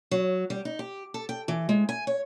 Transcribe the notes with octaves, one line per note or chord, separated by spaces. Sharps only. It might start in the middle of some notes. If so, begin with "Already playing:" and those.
F#3
G3
D#4
G4
A4
G5
E3
G#3
G#5
C#5